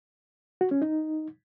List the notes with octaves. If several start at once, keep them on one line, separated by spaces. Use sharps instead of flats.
F#4
C#4
D#4